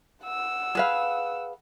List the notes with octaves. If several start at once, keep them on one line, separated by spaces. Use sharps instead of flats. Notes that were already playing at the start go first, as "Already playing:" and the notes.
F#5 E6
G#4 B4 F5